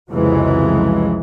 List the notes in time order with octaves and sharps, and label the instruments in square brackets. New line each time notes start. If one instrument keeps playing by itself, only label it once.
[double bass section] C2 F2 C#3 E3 F#3 G#3